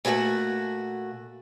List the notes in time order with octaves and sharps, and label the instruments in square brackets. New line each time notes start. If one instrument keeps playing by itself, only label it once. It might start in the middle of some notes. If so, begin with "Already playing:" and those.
[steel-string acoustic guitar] A#2 A3 F#4 G#4 F#5